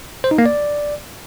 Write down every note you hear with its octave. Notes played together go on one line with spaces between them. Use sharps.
C5
D#4
A#3
D5